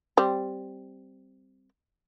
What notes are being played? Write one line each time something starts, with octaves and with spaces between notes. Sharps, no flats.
G3 C4